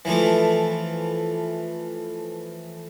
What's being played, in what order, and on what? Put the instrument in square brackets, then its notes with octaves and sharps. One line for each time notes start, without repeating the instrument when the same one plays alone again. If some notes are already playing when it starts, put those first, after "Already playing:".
[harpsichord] E3 F3 A3